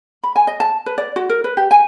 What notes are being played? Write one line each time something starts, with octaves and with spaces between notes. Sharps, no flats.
B5
G#5
D#5
A5
B4
D5
F#4
A#4
B4
G4
G#5